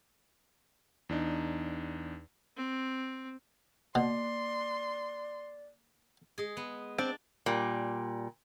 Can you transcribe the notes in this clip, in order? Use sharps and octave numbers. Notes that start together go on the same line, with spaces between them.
E2 D4 D#4
C4
B2 A#3 D5 C6
G#3 G#4
B3
C4 D4 D5
A#2 G3